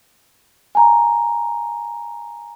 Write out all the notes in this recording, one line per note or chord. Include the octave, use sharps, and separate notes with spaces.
G#5 A#5